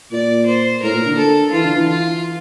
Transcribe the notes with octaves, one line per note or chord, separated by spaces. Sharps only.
A#2 D5
C5
A2 A#4
A#2
D3
A4
E3 F4
D3
E3
F4